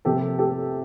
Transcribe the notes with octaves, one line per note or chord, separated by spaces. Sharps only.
C3 F3 A#3 G4 A4
G4 A4